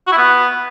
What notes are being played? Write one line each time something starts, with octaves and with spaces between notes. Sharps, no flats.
F#4
E4
B3